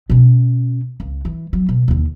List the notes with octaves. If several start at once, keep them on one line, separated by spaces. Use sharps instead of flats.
B2 C#4
C#2
E3
F#3
B2
D#2 D3